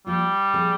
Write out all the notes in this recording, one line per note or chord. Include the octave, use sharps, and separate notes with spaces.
F3 G3 A#3 F4
A#2 F3 C4 F4 G#4